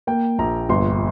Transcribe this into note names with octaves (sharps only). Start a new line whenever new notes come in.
A#3 G5
A#1 A#5
G1 C6